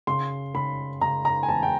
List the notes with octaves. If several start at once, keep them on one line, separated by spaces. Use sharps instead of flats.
C#3 C6
C#3 B5
C#3 A#5
A#5
G#5
E2 A5
G5